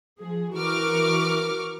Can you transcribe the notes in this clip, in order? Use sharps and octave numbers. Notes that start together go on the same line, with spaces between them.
F3 G#4
E3 F#4 A#4 C#6 D6 F6